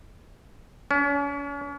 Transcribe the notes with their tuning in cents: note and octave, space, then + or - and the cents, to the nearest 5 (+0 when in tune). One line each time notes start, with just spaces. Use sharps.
C#4 +40